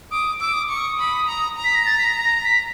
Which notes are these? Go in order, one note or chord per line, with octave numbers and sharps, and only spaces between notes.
D6 D#6
D6 E6
D#6
D6
C#6
D#6
B5
A#5
A#5
B6
A#6
A6
B6
A#6
A#6
B6